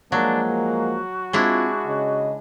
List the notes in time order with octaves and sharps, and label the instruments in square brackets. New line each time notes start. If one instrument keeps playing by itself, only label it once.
[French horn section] F3 G#3 A#3 [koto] F#3 [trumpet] D4
[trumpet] F#4
[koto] G#3 D4 E4 [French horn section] C4 F4
[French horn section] C#3 D#5